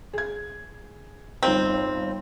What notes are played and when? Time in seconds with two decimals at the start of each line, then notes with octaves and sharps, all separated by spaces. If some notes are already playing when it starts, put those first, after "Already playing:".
0.13 G#4 G#6
1.43 G1 C4 D#4 F4